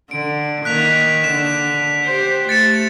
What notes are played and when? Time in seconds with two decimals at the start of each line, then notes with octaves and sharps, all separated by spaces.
0.11 D3 D7
0.65 D#3 A#3 F#6 B6 F7
1.24 D3 E7
2.04 G4 C5
2.49 A3 A6 C#7 E7